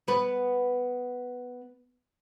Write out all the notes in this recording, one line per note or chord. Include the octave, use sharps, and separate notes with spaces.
B3 B4